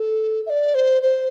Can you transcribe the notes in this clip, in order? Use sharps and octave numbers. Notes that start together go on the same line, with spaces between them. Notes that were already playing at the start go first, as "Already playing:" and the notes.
Already playing: A4
E5
D5
C5
C5